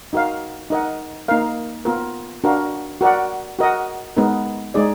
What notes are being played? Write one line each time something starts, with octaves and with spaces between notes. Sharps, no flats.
D#4 F#4 A#4 F5
D#4 A#4 D#5 F#5
A#3 D#4 A#4 F5
B3 F4 A#4
D4 F#4 A#4 F5
F#4 A#4 D5 F#5
F#4 A#4 D#5 F#5
G#3 B3 D#4 A#4
G#3 D#4 G#4 D5